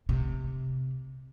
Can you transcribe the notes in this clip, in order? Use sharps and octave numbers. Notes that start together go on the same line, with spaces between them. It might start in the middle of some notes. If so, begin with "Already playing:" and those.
C3